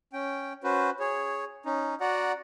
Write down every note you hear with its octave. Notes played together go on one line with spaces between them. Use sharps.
C#4 G5
C#4 F#4 B4 C5
G#4 C#5
C#4 D#4
F#4 D5 F#5 A#5